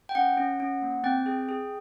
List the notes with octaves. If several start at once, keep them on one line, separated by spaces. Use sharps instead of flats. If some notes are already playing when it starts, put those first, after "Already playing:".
G5
C#4 F#5
C#4
C#4
A#3
C4 G5
G#4
G#4